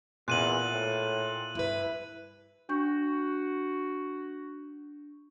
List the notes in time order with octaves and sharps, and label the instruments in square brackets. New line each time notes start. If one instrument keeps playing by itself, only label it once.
[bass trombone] E2 [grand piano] A#2 [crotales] F#6 D#7 F#7
[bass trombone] A2
[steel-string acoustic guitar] G2 B4 [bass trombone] E4
[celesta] D4 C#6 G6 [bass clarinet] F#4